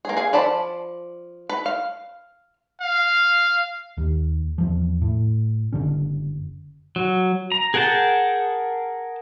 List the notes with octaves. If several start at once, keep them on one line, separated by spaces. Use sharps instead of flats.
A#3 G#4
G#4 F5
F3 D5 A5 B5
B4
F5
F5
D#2
E2 F3
A2
F#1 C#2 D3 C#4
F#3
A#5
G#4 A#4 F#5 G5 A5